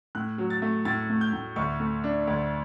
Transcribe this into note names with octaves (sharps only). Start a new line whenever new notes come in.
A2 F#6
F#3
A6
A3
A2 A6
A3
G6
A2
D2 C#6
A3
D4
D2